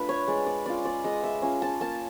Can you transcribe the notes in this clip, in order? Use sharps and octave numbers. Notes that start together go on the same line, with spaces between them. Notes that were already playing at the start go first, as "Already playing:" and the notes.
Already playing: A3 D4 F4 B4
C#5
G#3 D5
D5
C#4 F4 D5
D5
G#3 D#5
E5
C#4 F4
A5
A#3 A5